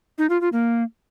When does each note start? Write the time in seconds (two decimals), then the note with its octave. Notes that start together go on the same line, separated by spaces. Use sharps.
0.18 D#4
0.30 F4
0.41 F4
0.53 A#3